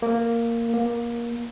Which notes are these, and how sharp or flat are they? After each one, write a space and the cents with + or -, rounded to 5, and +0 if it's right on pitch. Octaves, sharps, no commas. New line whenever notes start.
A#3 -5
A#3 +20